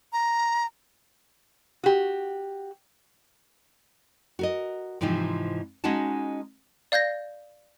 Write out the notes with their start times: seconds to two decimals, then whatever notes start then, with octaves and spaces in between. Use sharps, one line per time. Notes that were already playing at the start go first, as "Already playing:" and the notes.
0.13 A#5
1.84 F#4 G4
4.39 F#4 A#4 D#5
5.01 G#2 C3 E3 F3 D#4
5.84 G#3 C#4 D#4 F#4 F#5 A5
6.92 D5 F5 G6 G#6 A#6